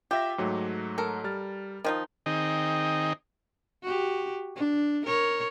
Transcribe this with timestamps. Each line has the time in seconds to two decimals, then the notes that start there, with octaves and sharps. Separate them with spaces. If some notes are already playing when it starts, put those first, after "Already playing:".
0.11 F4 G4 E5 A#6
0.38 G#2 F#3 A3
0.98 A4 A#4
1.24 G3 F6 A6
1.84 D#3 F3 D#4
2.26 D#3 C4 D#4 G#4 D#5 G5
3.83 F#4 G4
4.56 D4
5.06 A#4 C#5